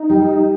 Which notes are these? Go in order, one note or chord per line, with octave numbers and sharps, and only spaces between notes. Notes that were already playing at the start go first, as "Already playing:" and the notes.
Already playing: D#4
G3